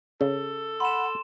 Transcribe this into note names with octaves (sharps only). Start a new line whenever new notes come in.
C#3 A4
F#5 B5 C6 E7